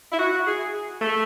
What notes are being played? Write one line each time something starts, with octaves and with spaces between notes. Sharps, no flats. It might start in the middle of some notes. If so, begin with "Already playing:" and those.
E4
F#4
G#4
A3